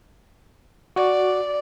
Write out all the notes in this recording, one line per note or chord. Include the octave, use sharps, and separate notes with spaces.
F#4 D5